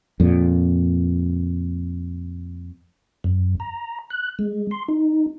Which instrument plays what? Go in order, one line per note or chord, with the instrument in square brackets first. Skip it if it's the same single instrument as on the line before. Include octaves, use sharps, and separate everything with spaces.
[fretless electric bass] F2 A#2
[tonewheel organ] F#2
A#5
F#6
G#3
C6
D#4